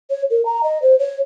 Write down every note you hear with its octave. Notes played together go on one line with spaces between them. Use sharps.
C#5
A#4
A#5
D#5
C5
C#5